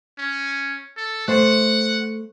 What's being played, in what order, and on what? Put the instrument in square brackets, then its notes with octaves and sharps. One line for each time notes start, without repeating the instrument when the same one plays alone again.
[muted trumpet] C#4
A4
[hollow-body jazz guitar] A3 C5 [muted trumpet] F#5